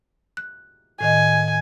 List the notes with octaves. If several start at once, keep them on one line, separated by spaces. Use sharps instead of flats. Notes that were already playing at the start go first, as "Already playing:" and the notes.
F#6
A2 D#3 D#5 G#5